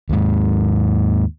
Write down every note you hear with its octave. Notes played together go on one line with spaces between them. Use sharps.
D#2 G#2